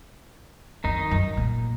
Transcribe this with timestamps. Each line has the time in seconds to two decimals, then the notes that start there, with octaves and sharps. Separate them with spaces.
0.84 F2 D#3 D#4
1.11 F#2
1.37 A#2